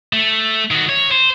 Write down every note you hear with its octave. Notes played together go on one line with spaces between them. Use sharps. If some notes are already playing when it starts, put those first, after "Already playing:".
A3
D#3 F#4
C#5
C5